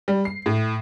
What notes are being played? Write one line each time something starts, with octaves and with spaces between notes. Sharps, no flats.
G3
C7
A2